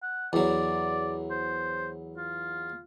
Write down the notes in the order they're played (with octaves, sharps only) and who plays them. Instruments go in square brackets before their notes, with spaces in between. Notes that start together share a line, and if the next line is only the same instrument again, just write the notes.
[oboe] F#5
[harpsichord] E2 F#3 [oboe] D5
[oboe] C5
F4